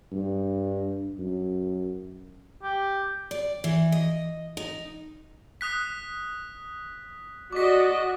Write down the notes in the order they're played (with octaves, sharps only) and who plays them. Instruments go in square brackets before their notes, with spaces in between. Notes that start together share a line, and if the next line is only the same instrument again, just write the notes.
[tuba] G2
F#2
[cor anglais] G4
[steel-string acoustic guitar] D5
E3
D#5
D#4
[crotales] D#6 F#6 B6
[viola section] F#4 D5 D#5 [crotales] D6 B6